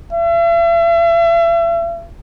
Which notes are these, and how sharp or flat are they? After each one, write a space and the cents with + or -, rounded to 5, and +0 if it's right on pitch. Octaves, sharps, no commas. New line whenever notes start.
E5 +40